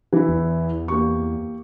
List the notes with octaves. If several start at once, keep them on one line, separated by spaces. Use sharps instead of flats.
E3 E4
E2
A#3 G4 C#6